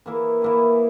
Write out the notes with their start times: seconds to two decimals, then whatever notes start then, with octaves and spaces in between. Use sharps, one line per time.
0.06 E3 A#3 E4 G#4
0.42 E3 A#3 E4 G#4